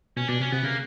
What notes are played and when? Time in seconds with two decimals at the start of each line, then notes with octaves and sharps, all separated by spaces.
0.17 B2 C#4
0.28 B2 D4
0.40 C3 C#4
0.52 C3 B3
0.63 C#3 A#3